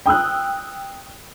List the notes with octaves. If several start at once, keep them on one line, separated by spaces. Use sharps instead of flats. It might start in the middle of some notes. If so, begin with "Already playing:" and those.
G5 D#6 E6 F#6